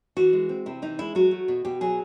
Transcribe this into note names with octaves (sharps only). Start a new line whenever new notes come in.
E3 F#4
G#3
C4
C3 E4
E3 D#4
G#3 E4
F#3 F#4
A3
B2
B2 G4
F#3 G#4